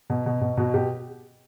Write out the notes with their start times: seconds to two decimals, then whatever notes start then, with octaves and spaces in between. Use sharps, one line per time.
0.10 B2
0.26 B2
0.41 B2
0.57 B2 F#4
0.74 B2 G4